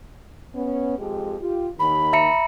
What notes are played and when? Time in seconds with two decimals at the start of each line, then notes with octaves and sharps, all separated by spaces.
0.55 B3 C#4
0.99 F2 G#3 G4
1.40 F4 G4
1.79 D#2 D#3 B5
2.13 E5 A#5 C#7